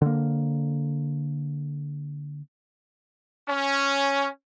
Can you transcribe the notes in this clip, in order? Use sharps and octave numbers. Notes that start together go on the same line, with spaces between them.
D3 A#3
C#4